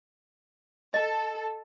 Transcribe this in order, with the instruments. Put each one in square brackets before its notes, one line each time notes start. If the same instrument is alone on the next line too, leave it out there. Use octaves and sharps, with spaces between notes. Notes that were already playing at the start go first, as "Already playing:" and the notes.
[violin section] A4 [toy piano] D#5